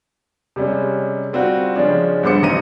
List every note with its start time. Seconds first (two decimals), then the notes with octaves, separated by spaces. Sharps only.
0.56 C3 G3 G#3 C#4
1.33 G3 C4 F4 F#4
1.76 C#3 F3 G#3 C#4 D4
2.23 G2 B3 C5 D6 C#7
2.41 D#1 A1 D#3 A#5 A#6 D#7